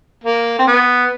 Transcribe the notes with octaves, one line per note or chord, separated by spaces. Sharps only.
A#3
C4
B3